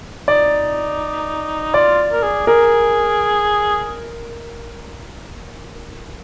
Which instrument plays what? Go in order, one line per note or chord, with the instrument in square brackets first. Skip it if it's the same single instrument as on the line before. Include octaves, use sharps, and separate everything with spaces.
[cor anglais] D#4 [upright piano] D5
[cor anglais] F4 [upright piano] D5
[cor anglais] A#4
G#4
[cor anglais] G#4 [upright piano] A#4